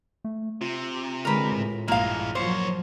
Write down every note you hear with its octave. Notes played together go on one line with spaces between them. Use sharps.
A3
C3 F4
D3 G#3 A#4 B4
A2
A#1 G2 E3 G#3 A#3 F5
F3 F#3 A#3 C5 C#5